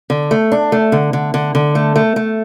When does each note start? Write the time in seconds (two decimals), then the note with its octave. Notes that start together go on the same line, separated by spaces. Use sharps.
0.10 D3
0.31 A3
0.52 D4
0.72 A3
0.92 D3
1.13 D3
1.34 D3
1.55 D3
1.75 A3
1.96 A3
2.16 A3